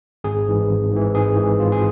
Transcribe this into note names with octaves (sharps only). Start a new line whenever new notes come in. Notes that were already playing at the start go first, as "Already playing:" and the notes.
G#1 G#4
G#2 E3
G#1
G#2 E3
G#1 G#4
G#2 E3
G#1 F4
G#4